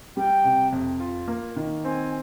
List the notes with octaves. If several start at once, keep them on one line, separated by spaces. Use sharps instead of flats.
G3 G5
C3
F2
F4
A#3
D#3
C4 G#5